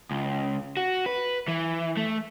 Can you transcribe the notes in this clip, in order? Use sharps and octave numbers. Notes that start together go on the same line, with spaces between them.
C#2
F#4
B4
E3
A3